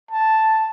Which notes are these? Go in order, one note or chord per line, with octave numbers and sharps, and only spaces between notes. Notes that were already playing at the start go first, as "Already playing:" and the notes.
A5